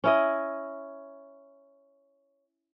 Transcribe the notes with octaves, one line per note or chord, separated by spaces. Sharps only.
C#4 E4 D#5